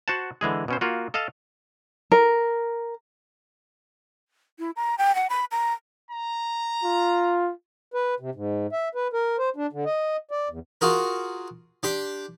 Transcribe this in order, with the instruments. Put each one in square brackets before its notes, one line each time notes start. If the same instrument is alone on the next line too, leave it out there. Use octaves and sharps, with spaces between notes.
[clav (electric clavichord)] F#4 C5 F#5 A5
D3 E3 G#3 G#4
B2 C#4 C5
A#3 F4 F#4
A4 D#5 F5 A5
[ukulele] A#4
[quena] E4
A#5
G5
F#5
B5
A#5
[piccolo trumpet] A#5
[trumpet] F4
[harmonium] B4
C3
G#2
E5
B4
A#4
C5
D4
D3
D#5
D5
E2
[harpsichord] F4 F#4 G#4 A#4
D4 G4 C6